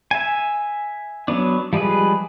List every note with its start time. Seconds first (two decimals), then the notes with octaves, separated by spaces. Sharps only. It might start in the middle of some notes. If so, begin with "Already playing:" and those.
0.11 E5 G#5
1.28 F#3 B3 D4
1.73 F3 G3 G#3 G#4 B4